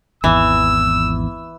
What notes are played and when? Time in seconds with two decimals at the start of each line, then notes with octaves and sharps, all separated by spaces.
0.24 G#1 E2 E3 E6